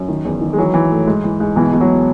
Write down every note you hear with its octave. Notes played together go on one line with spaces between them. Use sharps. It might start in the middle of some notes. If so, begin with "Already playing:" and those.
Already playing: F#2
D#3
E2
D#3
G#3
E3 F#3
E3
A2
G#2
E3
G#2
B2 E3
B2
F#3